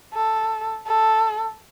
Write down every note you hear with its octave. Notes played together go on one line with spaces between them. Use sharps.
A4
A4